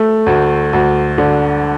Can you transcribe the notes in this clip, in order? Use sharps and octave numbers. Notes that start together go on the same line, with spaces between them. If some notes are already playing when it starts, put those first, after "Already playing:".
Already playing: A3
D2
D2
D3